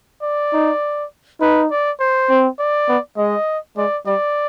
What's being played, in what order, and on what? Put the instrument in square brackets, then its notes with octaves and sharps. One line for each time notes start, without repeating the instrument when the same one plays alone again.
[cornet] D5
[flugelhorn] D#4
[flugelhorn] D#4 [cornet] B4
[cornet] D5
C5
[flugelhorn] C4
[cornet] D5
[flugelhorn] B3
[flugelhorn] G#3 [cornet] D#5
[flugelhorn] G#3 [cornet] D5
[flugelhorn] G3 [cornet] D5